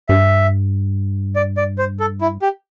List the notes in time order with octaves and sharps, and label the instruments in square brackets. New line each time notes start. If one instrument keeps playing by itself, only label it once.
[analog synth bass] G2 [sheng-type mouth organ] E5
[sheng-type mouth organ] D5
D5
C5
A4
E4
G4